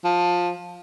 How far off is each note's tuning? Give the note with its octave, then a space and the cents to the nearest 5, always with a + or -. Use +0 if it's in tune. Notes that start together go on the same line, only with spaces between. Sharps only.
F3 +15